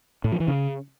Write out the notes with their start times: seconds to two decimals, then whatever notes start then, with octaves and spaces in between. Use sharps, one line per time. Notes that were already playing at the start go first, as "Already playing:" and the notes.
0.24 A2
0.32 F3
0.40 E3
0.48 C#3